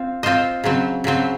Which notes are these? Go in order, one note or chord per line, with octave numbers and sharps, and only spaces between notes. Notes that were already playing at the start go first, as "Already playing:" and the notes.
Already playing: C4 F4
C4 F4 C5 D#5
C#3 F#3 C4
C#3 F#3 C4